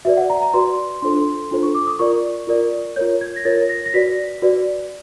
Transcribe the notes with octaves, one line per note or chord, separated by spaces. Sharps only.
F#4 B4 D5 E5
F#5
A#5
A#5
F#4 B4 D5 C6
D4 F4 A4 C5 C6
D4 F4 A4 C5
C#6
D6
D#6
F4 A#4 D5 C#6
F4 A#4 D5
F4 A#4 C#5 G6
G#6
A#6
F4 A#4 C#5 A6
A#6
A#6
F#4 B4 D5 B6
F#4 B4 D5